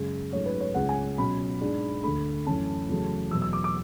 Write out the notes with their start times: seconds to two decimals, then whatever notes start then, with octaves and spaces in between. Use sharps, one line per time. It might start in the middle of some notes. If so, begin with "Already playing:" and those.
Already playing: F#2 C#3 G#3
0.32 G#2 F#3 A3 C#4 C#5
0.46 B4
0.60 C#5
0.74 C#2 C#3 G#3 C#4 F#5
0.89 G#5
1.18 B2 F#3 C#4 B5
1.60 G#2 G#3 D4
2.03 D2 D3 A3 B5
2.46 F#2 E3 A3 C#4 A5
2.89 E2 C#3 F#3 A3 C#4
3.31 E2 B2 F#3 B3 E6
3.42 E6
3.53 D6
3.64 D6